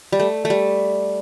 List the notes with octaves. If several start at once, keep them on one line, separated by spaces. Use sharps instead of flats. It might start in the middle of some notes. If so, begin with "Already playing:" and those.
G3
A3
A3
G3